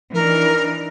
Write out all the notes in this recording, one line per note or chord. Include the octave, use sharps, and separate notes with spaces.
E3 D4 D#4 A#4